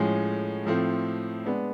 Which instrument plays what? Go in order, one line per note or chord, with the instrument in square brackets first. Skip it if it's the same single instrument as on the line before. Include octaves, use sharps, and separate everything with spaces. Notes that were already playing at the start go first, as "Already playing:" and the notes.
Already playing: [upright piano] A2 F3 G#3 C#4
A2 F3 A3 C4
G#3 B3 D4